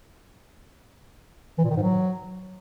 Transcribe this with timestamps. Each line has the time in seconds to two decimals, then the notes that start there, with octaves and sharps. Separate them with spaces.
1.58 E3
1.64 A#2
1.70 D#3
1.76 G#2
1.82 F#3